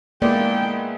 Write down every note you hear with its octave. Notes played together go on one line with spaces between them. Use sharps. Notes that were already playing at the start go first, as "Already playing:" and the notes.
G#3 A#3 B3 E4 D5 G5